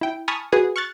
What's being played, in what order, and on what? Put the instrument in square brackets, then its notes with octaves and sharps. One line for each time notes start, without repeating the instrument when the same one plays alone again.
[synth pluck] E4 G5
G#5 A5 B5 C#6 D#6 F6
F#4 G#4 B4 G#5 D#6
C#6 F6 F#6 A6